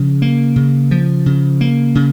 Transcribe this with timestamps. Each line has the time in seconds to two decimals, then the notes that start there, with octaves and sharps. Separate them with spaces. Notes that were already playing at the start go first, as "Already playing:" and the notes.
Already playing: C#3 F3
0.22 A#3
0.56 C#3
0.91 F3
1.26 C#3
1.61 A#3
1.95 C#3